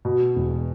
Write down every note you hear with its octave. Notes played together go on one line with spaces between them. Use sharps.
B2
E1